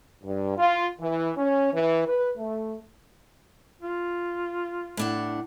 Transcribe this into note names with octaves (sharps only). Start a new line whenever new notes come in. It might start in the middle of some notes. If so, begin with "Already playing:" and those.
G2
F4
E3
C#4
E3
B4
A3
F4
A2 D4 F#5